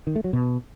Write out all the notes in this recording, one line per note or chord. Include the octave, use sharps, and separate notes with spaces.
D#3
A3
F#3
B2